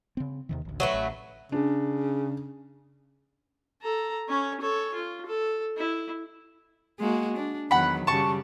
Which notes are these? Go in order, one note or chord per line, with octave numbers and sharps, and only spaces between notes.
C#3 C4
D#2 C3 D#3
A1 D2
F#3 A3 B4
A1
C#3 D4
A4 A#5
C#4 C#5
A4 C#5
F4
A4
E4
G#3 A#3 F#4
D4
E2 D#3 F#3 F#5 B5
F#2 C#3 G3 A5 C#6